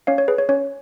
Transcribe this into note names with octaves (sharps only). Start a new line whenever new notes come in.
C#4 C#5 F5
C#5
G#4 B4
C#5
C#4 C#5